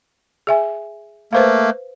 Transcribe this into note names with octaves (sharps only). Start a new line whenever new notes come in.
G#4 E5 G#5
A3 A#3 B4 C5 F5